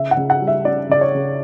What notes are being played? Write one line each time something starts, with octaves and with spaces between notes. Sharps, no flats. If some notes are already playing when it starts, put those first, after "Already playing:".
Already playing: C#3 E5
F#5
C#3
F#5
G3
E5
C#4 D5
C#3 D5
C#5
C#3